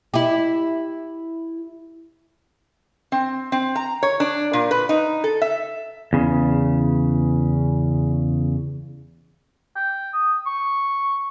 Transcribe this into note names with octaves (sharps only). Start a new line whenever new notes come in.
E4 G4
C4
C4
A#5
C#5
D4
A#2
B4
D#4
A4
E5
E2 C#3
G5
D#6
C#6